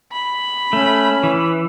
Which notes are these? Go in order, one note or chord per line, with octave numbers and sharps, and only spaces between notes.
B5
A3 C#4
E3